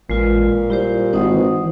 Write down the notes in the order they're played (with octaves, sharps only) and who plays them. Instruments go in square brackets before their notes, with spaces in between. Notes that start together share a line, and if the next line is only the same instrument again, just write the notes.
[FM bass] A1 [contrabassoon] A#2 [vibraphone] G#3 F4 B4
[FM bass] G3 [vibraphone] E4 G4 C5
[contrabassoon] G#1 [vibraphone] C5 F#5 D#6
[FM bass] E3